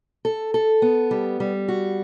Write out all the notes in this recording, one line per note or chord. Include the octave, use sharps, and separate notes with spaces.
A4
A4
B3
G3
G3
F#4